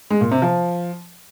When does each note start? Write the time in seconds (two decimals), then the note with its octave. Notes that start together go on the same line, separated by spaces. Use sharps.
0.10 G#3
0.21 A#2
0.31 C3
0.42 F3